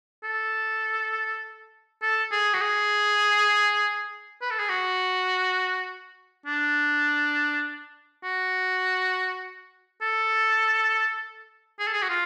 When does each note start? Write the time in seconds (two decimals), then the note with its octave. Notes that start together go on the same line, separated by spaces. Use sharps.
0.24 A4
2.02 A4
2.31 G#4
2.54 F#4
2.61 G#4
4.41 B4
4.50 A4
4.59 G#4
4.69 F#4
6.46 D4
8.24 F#4
10.02 A4
11.79 G#4
11.87 A4
11.93 G#4
12.02 F#4
12.09 F4